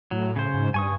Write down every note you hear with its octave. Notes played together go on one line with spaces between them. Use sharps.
A2 F#3
C#3 C5
G#2
G2 G#5 C#6 D#6